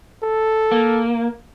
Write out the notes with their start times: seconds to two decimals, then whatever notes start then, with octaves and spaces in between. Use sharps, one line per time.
0.23 A4
0.71 A#3